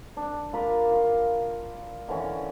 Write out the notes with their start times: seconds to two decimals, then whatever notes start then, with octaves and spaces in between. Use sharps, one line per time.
0.17 D4
0.53 F4 A#4 B5 D6
0.91 F4
2.08 D3 E3 C#4